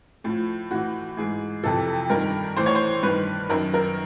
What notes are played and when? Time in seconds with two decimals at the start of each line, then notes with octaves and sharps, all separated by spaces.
0.24 A2 F3
0.71 A2 E3 F#4
1.17 G#2 E3 G#4
1.64 F2 C3 E3 A4
2.10 G2 D#3 A#4
2.56 A2 E3 C5
2.66 C#5
2.75 C5
3.03 G2 D#3 B4
3.49 F#2 D#3 A#4
3.74 A#4